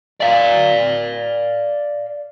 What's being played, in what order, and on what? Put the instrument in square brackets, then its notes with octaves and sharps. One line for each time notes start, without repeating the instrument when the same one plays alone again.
[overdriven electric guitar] D5 F5